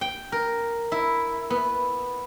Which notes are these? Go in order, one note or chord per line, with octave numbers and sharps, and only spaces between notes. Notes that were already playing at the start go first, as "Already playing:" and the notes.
G5
A#4
E4
B3